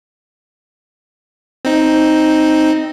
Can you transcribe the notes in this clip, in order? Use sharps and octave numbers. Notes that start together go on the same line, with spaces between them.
C4 D#4